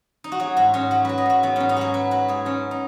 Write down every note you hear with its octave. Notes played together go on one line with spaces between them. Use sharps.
D#4
F#4
F#3 G#4
G#2 F#4
G#2 C#4
F#3 F#4
F#3 B4
D#5
G#2 F#4
F#3 B3
G#2 C#4
D#4
G#2 F#4 G#4
F#3 B4
F#3 B4
G#2 G#4
F#3 C#4
D#4